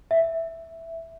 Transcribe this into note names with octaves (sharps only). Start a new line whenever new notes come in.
E5